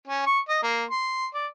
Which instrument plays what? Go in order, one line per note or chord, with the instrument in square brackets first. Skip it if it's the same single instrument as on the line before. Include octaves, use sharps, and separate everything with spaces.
[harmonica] C#4
C#6
D#5
A#3
C6
D5